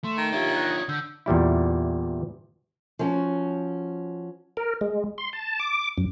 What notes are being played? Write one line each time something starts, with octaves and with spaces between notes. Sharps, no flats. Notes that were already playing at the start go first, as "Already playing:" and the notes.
A3 C6 E7
D#3 E7
D4 F4 G4 C#5 E5
F#6 A#6
D#6
D3 E6 G6
E2 A#2 G3 E4
F3 C#4 F#4
A#4
G#3
C6
A5
D6
F#2